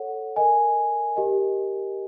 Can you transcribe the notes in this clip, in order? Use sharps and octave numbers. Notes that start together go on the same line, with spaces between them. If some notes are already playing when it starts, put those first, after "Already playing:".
Already playing: A4 C#5 F#5
A#4 D#5 G#5
G4 A#4 D#5